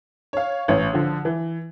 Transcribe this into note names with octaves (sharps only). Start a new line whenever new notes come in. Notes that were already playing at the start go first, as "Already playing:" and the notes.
C#5 F5
A1 C#4 C#5
D3 F3
E3